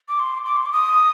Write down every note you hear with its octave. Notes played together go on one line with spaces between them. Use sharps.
D6
C6
D6
C6
D6
D#6